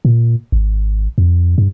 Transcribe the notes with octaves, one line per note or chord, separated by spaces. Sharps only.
A#2
G#1
F2
G2